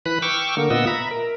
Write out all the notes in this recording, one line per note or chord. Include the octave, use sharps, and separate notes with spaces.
E3 B4 B5 F#6
G5 C#6 D6 E6 F6
D3 A#3
A#2 B3 F4 D#5 F#5 E6
E5 A#5 B5
A#4